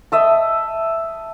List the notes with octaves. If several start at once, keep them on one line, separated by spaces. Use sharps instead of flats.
D#5 E5 A5